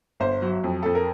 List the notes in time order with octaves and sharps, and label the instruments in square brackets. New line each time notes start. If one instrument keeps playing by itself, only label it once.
[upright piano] G1 C5
F#3
F2
F2 A4
A#4